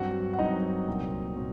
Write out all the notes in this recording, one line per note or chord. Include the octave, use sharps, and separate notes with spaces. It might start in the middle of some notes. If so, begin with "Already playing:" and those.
Already playing: G2 F#3 C4 F#4 F#5
F#5
G2 F#3 C4 D#4 D#5
C2 A#2 F#3 C4
A#2 F#3 C4